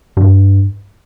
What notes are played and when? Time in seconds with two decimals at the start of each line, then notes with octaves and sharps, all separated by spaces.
0.17 G2